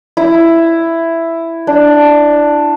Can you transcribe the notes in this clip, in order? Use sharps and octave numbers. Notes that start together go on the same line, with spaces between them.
E4
D4